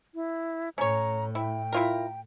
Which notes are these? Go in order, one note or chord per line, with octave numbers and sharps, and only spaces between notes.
E4
A2 C#4 C#5 A#5
E4 G5
E4 F4 A#4